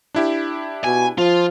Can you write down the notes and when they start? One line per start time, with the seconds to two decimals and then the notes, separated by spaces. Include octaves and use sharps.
0.15 D4 E4 G4
0.84 B2 G#5
1.18 F3 F4